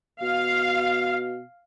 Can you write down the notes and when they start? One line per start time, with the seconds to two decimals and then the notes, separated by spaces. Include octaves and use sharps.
0.22 B2 F5